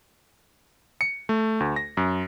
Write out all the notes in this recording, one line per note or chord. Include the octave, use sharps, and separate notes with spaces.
C#7
A3
D2
A#6
F#2